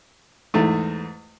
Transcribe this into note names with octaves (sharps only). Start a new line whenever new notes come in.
E2 G#2 A3